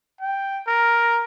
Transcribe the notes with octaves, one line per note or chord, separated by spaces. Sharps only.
G5
A#4